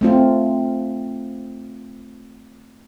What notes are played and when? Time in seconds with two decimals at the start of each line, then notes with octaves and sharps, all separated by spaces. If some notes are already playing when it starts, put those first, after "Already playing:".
0.01 A3 C4 F4